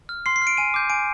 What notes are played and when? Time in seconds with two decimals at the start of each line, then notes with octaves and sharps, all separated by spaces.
0.09 F6
0.26 C6 C7
0.36 C7
0.42 F6
0.47 D7
0.57 G#5 D#7
0.74 D6 G6
0.90 G#5 D7